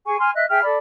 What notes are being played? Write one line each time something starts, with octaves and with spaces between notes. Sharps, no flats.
G#4 G#5 C#6
G#5 C6 F6
D#5 E5 F#6
G#4 E5 G5 F6
A4 D5 B5